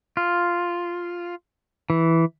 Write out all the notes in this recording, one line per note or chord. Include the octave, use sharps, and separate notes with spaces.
F4
E3